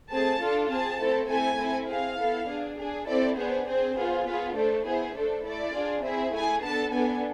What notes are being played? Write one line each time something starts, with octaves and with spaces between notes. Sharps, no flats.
A3 C4 G#4 A5
D4 F4 A4
C4 G#4 A5
A3 C4 E4 A4
A3 C4 E4 A4 G#5
C4 E4 A4
C4 G#4 F5
B3 E4 A4
D4 G#4
D4 G#4
C4 E4 A4 D5
B3 D4 G#4 C5
C4 G#4 C5
B3 F4 G#4
B3 F4 G#4 B4
A3 D4 A4 C5
B3 E4 G#4 C5
A3 D4 A4 C5
A3 E4 A4 D5
D4 F4 G#4
C4 E4 G#4 E5
A3 E4 G#4 G#5
B3 D4 A4 A5
B3 D4 A4 G#5